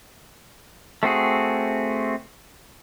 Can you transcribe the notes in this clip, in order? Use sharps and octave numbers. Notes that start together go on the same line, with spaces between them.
A3 C4 F#4 G#4